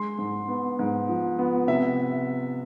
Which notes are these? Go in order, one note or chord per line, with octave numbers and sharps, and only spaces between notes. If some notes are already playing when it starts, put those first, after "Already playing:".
Already playing: G#3 C6
G#2
B3
G#2
F3
B3
C3 E5